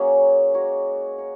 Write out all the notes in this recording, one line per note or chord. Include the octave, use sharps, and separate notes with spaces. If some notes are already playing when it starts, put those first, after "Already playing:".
Already playing: F#3 A#3 C#4 G#4
G#3 F#4 A#4 C#5
A#4 C#5